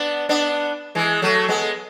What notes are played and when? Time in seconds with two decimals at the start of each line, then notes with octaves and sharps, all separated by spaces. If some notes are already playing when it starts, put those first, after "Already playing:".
Already playing: B3 D4
0.29 B3 D4
0.95 E3 G#3
1.22 F#3 A3
1.48 G#3 B3